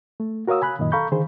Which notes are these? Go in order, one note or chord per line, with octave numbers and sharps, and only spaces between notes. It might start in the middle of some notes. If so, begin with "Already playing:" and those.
A3
F#4 A#4 C#5 F5 D#6 E6
G#5 B5 F#6
F#2 A#2 D#3 D#5
A4 F5 A#5 B5 C#6 G6
D3 D#3 G#4 C5